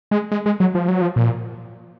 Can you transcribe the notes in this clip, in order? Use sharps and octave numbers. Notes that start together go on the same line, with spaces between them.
G#3
G#3
G#3
F#3
F3
F#3
F3
A#2